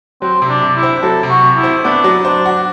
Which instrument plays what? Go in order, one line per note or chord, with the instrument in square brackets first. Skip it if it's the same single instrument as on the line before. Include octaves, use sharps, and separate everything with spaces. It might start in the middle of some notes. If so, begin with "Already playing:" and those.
[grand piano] F#3 [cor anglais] C4
[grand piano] C3
[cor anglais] D4
[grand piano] C3
[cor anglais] E4
[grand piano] C4
[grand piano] F#3 [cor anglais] A4
[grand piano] C3
[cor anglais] F#4
[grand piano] C3
[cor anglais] E4
[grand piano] C4
[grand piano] B3 [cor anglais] D4
[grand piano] F#3
[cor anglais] D4 [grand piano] C5
[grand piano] F#4